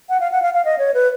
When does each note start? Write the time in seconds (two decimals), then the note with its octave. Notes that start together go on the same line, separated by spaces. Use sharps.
0.09 F#5
0.20 F5
0.32 F#5
0.42 F5
0.54 F5
0.65 D#5
0.78 C#5
0.94 B4